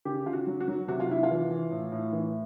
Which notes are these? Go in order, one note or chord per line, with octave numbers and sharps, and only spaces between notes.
C#3 G4
C#3 F4
F#4
F#3
F#4
F#3
C3 F#4
F4
C3 E4
F4
E3
E3
A2
A2
E3